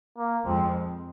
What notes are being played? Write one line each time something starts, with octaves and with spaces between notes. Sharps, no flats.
A#3
F2 F3 G#3 C4